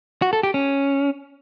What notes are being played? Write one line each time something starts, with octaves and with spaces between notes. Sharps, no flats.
F#4
A4
G4
C#4